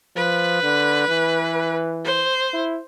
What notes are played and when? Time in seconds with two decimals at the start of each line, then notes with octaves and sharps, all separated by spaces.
0.16 F3 B4
0.63 D3
1.08 E3
2.05 C5
2.53 E4